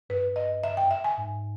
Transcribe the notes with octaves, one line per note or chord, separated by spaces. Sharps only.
G2 B4
D#5
E5
G5
E5
G#5
G#2